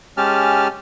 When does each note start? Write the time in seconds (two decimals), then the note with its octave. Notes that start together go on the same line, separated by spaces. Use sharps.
0.17 G#3 C#4 G4 A5 F6